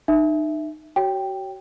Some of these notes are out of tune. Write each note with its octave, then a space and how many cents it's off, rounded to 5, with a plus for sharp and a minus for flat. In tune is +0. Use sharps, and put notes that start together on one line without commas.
D#4 -30 E5 +0
F#4 +35 C#5 +0 G5 +0